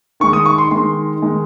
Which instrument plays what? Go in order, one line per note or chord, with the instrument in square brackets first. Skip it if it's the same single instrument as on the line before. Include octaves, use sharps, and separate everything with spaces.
[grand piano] D#3 G#3 C#6
D#6
C#6
C6
D#3 G#3 C6
D#3 G#3